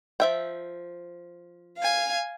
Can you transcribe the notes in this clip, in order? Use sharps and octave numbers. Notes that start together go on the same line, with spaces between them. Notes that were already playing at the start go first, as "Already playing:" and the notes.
F3 E5 G5
F5 G#5